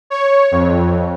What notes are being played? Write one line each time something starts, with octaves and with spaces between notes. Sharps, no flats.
C#5
F2